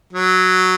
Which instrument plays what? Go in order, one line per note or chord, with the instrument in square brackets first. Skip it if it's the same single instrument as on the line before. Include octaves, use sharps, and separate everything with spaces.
[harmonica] F#3